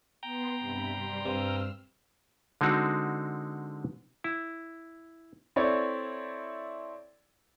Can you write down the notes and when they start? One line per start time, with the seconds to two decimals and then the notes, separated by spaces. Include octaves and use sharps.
0.23 B3 G5 A#5 C6
0.59 G2 C3 B5
0.92 G3 C6
1.26 G2 C4 E6 F6
2.61 D3 G#3 C4 D#4 F#4
4.24 E4
5.56 C4 E4 A4 C#5 D5